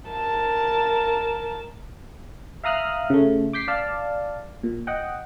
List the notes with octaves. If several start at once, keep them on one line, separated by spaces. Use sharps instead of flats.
A#4 A5
E5 F5 A#5 D#6 F6 F#6
C#3 A3
D6 G6 B6 C7
D5 F5 A5
A#2
D#5 F#5 G5